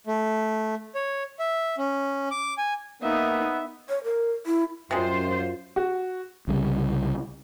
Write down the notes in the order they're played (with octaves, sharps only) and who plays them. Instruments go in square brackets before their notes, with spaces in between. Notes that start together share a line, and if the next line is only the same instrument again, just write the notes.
[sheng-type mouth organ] A3
C#5
E5
C#4
D6
G#5
[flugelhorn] A#3 [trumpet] B3 [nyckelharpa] D#4 [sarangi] E5
[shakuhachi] C#5
A#4
E4
[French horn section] F#2 [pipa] C3 G#3 [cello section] F4 C5
[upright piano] F#4
[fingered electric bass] C2 C#3 G3